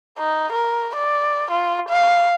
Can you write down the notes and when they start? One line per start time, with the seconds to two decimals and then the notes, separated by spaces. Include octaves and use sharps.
0.18 D#4
0.52 A#4
0.95 D5
1.51 F4
1.89 F5